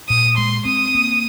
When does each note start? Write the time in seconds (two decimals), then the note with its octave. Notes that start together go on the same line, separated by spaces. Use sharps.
0.09 A#2 D#6
0.37 G#3 C6
0.65 C4 D#6
0.95 A#3